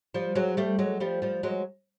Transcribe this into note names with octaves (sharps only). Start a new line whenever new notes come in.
F3 G3
F#3 G#3
G3 A3
F#3 G#3
F3 G3
F3 G3
F#3 G#3